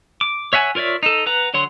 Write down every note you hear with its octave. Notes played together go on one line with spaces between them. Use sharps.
D6
C#5 E5 F#5 G#5
F4 A#4 C#5 D5 E5
D#4 A4
B4 F#5 A#5
D3 F#3 C#5 F#5 C6